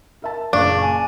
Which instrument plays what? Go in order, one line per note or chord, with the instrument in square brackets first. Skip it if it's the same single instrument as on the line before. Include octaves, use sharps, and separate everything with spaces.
[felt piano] A#4 E5 A5
[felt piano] F#1 A#2 F5 [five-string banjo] D4 [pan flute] C#6
[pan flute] G#5